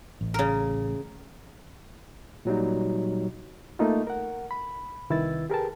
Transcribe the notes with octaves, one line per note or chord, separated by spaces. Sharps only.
A1
C#3 A#4
A#2 F#3 G3 D#4
A3 A#3 D#4 F4
A#4 F#5
B5
C2 D#3 E4 B4 E6 A6
G4 G#4 A#4 B4 G5 A5